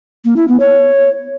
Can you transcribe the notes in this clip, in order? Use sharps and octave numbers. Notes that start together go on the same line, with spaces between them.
A#3
E4
B3
C#5